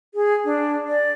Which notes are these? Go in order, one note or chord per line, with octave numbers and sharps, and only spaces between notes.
G#4
D4
D5